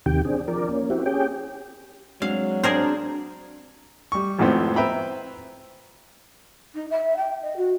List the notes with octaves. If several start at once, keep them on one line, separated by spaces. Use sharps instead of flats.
D#2 C3 D#3 G4 G5
C4 D4 G#4
F3 A#4 D5
A#3 C#4
C4 E4 F#4 G4
C#4 G4 G#4 G5
F#3 G#3 C4 D4 F5
C4 D4 G#4 A#4 C5 D5
G3 C#6
G#1 F2 A2 B3 C4
B4 C5 E5 G5 A#5 B5
D#4
E5
G5
D#5
F#4